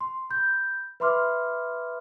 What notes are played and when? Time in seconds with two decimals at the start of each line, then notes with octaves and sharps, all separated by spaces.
0.01 C6
0.30 B5 G6
1.00 B4 E5 B5 C6 D6 F6